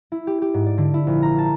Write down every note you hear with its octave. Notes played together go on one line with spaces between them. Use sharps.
E4
G4
G4
G#2
D5
D3
E4
A#1
A#5
A5